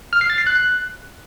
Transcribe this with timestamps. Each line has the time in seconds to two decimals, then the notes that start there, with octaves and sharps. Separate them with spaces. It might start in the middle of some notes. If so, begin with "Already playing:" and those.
0.13 F6
0.21 C7
0.30 A6
0.38 C7
0.47 F#6